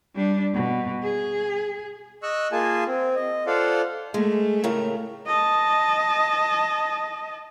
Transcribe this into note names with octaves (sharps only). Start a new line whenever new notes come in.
G3 D4
B2
G#4
D#5 C#6 E6 F#6
A#3 F4 G#4 G#5 A5
C4
D#5
F4 A4 C5 D5 F5 F#5
G#3 A3
A2 C#3 A#4
D#5 A5